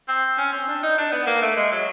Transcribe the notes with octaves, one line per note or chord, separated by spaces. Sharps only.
C4
C#4
C4
D4
D#4
D4
B3
A#3
A3
G#3
F#3